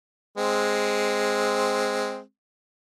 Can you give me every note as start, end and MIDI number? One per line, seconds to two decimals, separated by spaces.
0.38 2.20 56
0.38 2.20 60